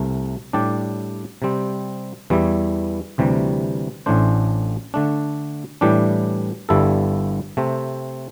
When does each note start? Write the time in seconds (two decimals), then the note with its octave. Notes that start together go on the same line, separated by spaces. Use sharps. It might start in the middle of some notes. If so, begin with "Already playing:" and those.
Already playing: C2 C3 A3
0.53 A2 G3 D4 G4 D5
1.42 C3 G3 C4
2.30 E2 E3 G3 E4
3.18 D2 C3 E3 G3
4.06 A1 A2 A3 D4 C5
4.94 D3 A3 D4
5.81 A2 E3 G3 D4 G4
6.69 G1 G2 G3 E4 A4
7.57 C3 A3 C4